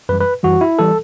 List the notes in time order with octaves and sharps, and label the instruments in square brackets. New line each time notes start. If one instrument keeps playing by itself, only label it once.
[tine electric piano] F#2 E3 G3 B4
B4
F#2 E3 G3 F#4
E4
E3 G3 A4